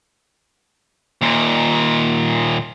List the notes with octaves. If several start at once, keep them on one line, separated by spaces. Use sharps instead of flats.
D#2 A#2